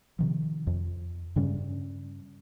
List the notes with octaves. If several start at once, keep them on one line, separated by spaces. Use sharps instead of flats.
C3 D#3 F3
F2
G2 C#3 G3 C#4